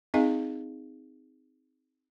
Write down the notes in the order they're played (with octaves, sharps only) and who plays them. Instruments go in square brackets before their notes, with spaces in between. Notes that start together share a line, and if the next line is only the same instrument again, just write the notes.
[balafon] C4 D#4 G#4 D#5 F5 G#5